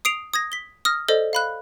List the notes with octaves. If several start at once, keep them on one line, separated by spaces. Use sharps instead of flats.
D#6 C7 D7 F7
D#6 G#6 A#6
B6 G7
D#6 F6 A#6
A4 C5 D5 D#5
F5 B5 F#6